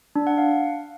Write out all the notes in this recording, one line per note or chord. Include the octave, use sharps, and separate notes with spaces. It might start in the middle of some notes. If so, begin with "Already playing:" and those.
D4
F#5
F5